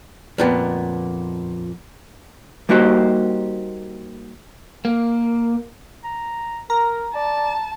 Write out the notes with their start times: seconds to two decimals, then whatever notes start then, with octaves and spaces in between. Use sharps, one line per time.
0.38 F2 A#2 B3
2.69 G3 A#3 D#4 F#4 G4 C5
4.85 A#3
6.04 A#5
6.70 A#4 A#5
7.15 D5 A5